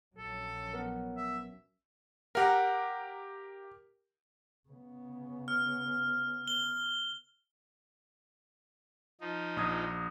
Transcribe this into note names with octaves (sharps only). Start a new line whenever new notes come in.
A#1 F#3 C#4 A4
B3 A#4
E5
G4 A#4 F5 F#5 A#5
C#3 B3
F6
G7
F3 D#4
A#1 D#6 G#6